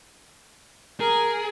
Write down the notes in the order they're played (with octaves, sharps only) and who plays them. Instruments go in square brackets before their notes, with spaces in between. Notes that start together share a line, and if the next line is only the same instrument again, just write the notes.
[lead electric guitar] G#4 [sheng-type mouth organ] A#4